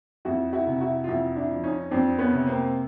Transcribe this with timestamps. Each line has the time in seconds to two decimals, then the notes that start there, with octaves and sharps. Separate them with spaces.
0.25 F2 E4 F#4
0.53 E4 F#4
0.67 C3
0.80 E4 F#4
1.04 F4
1.08 F2 E4 F#4
1.36 D4 E4
1.50 F3
1.64 C#4 D#4
1.91 F2 C4 D4
2.19 B3 C#4
2.33 C3
2.47 A#3 C4